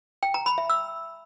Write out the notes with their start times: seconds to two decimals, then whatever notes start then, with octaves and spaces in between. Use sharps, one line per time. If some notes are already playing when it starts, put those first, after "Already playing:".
0.23 G5
0.34 A#5
0.46 B5
0.58 E5
0.70 E6